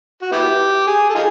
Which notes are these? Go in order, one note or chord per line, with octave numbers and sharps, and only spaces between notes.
F#4
B3 E4 G4
G#4
A4
D#4 F4 G#4